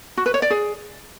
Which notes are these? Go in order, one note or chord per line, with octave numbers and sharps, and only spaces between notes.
F#4
B4
C#5
D5
G#4